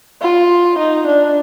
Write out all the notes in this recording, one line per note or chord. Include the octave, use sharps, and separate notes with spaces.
F4
D#4
D4